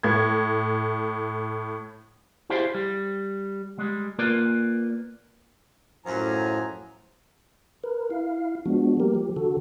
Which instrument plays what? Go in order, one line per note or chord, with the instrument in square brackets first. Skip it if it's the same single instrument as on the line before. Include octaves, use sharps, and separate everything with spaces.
[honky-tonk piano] A2 G#6
[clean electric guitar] E4 G4 G#4 C5 D5 F5
G3
G3 G#3
A#3 F4 A#4 B4 D5
[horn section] F#2 F3 G#5 [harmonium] A2 A#5
[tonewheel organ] A#4 B4
E4 F5
F3 G#3 B3 D4 F#4
G3 A#3 G4 A#4
F3 G4
D3 F#4 A4